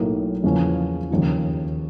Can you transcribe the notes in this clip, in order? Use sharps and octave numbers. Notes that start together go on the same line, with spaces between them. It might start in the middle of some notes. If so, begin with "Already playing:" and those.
Already playing: B1 A2 F#3 A#3 D#4
E2 C#3 F3 A#3 C#4
D#2 C#3 F3